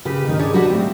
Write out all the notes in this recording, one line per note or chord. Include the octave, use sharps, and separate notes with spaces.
C#3 G4 B4
D#2 D#3 D#4
D4 G#4 C#5 D5
G3 F#4 G4 B4 F#5 A5
A3 C4